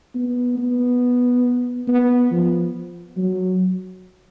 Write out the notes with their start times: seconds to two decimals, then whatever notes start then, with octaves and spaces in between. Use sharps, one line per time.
0.15 B3
0.58 B3
1.88 B3
2.32 F3
3.17 F#3